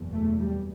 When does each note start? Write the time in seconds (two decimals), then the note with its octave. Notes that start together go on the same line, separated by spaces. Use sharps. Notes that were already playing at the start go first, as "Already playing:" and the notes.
Already playing: F#1 E2 B2
0.13 A3
0.40 G3